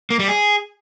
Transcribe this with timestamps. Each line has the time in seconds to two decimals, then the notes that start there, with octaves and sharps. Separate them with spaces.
0.10 A#3
0.19 G3
0.28 G#4